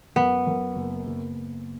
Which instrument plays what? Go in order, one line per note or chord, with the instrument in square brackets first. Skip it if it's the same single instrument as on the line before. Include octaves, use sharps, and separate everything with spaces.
[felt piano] F#2 [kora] B3
[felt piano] F#2
F#1
F#1